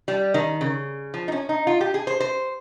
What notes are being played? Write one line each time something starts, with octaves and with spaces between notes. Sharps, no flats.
G3
D#3
C#3
F3
D#4
C#4
D#4
F4
G4
G#4
C5
C5